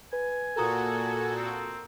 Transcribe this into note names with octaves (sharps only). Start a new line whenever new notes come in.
B4 G#5
A#2 F#4 A4 A#4 A#5 D#6
C4